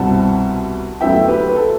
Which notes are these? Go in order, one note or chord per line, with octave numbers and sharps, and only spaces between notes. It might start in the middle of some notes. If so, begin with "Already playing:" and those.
Already playing: C2 B2 G3 C4 E4 F#5 A5
D2 D3 F#3 B3 E4 E5 G5
G4 B4
B4
A4